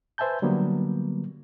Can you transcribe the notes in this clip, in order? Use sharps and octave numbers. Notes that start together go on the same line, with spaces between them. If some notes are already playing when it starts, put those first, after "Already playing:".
B4 C5 E5 G#5 A5 G6
D3 F#3 G3 A#3 B3